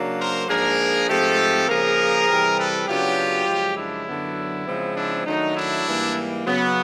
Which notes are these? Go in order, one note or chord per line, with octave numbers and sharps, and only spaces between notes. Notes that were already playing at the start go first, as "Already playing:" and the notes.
Already playing: C#3 F#3 A#3 D4
A#4 C5
G#2 F3 A#3 D4 G#4 A#4
G#2 F3 A3 C4 G4 A4
C#3 F3 A#3 G#4 A#4
C3 E3 G3 C4
A4 B4
C#3 F#3 B3 D4 F4 G4
F#2 C#3 F3 G#3
D4 E4
F#2 D3 F#3 B3 D4
C#3 F3 G#3 C4
D4 E4
D#3 F#3 A3 D4 D#4
D4 E4
G#2 E3 G3 A#3
C#3 F#3 B3